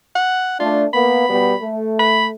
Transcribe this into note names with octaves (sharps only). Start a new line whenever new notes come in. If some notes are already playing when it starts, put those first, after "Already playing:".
F#5
A3 D4 F4
A#3 B3 B5
B2 G3 B3
A3
B5